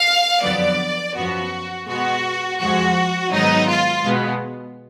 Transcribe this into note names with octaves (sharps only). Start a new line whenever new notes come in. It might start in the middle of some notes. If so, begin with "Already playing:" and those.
Already playing: F5
F2 D3 F#3 B3 D5
F#2 F3 B3 F#4
B2 G#3 B3 F#4
F2 F3 G#3 F#4
G#2 D#3 F#3 B3 D#4
F4
B2 G#3 B3